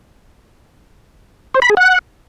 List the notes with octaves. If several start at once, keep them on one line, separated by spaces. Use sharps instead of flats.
C5
B5
G#4
F#5